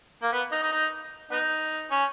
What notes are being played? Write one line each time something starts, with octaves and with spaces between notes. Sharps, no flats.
A#3
B3
D#4
D#4
D#4
B3 D#4
C#4